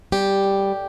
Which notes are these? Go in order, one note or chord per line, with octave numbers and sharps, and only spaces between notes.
G3 G4
A2